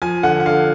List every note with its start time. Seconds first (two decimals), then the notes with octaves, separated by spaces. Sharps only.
0.02 F3 G#5
0.23 D3 F#5
0.40 F#5
0.46 D3 F5